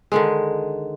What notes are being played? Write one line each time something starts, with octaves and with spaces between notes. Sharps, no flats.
D3 D#3 G#3